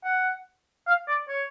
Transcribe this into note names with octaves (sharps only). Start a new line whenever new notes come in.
F#5
F5
D5
C#5